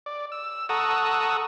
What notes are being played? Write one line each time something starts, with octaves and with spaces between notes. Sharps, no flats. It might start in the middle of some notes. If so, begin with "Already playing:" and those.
D5
E6
A4 F#5 A#5 C#6 D#6 E6